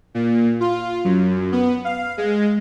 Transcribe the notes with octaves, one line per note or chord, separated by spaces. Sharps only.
A#2
F4
F#2
B3
F5
G#3